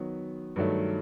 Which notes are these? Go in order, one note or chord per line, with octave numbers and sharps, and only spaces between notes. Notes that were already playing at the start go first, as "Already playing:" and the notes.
Already playing: D#3 F#3 B3
G2 D#3 F#3 A3